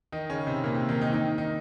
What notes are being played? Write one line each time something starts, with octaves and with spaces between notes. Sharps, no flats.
D#3 D#4
C#3 C#4
C3 C4
A#2 A#3
C3 C4
D#3 D#4
D#3 D#4
D#3 D#4
D#3 D#4